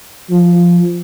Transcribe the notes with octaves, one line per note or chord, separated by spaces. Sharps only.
F3